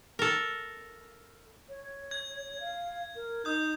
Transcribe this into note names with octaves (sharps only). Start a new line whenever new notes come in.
A4 A#4
C#5
G#6
F5
A#4
D#4 D#6 G6